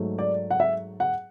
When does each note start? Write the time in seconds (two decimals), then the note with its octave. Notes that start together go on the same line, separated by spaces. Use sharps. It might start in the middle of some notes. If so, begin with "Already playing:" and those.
Already playing: G#2 F#3 A3
0.18 D5
0.51 F#5
0.60 E5
1.00 F#5